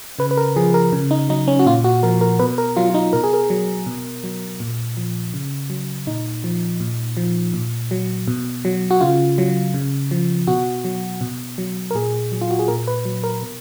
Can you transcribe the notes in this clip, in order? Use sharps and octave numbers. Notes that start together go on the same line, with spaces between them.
C#3 B4
B4
A#4
F3 G#4
A#4
C#3
D#4
F#3 D#4
C#4
F#4
A#2 F4
F#4
F3 A#4
A#4
B2 B4
A#4
F#3 F4
F4
D#4
B2 A#4
G#4
A#4
F#3
B2
F#3
A#2
F3
C#3
F#3
A#2 D#4
F3
A#2
F3
A#2
F#3
B2
F#3
F#4
C#3 F4
F#3
C#3
F3
B2 F#4
F#3
B2
F#3
A#4
A#2 G#4
F#3
F4
F#4
G#4
A#2 A#4
B4
F#3
A#4
B2